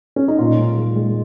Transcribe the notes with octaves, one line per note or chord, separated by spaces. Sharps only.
C#4
D#4
A#2 F4
G#3
G#3
G#3